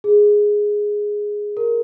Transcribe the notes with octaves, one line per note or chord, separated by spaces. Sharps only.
G#4
A#4